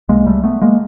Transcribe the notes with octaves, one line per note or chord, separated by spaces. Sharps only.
C2 C3 G#3 A#3
G3 A3
A3 B3
G#3 A#3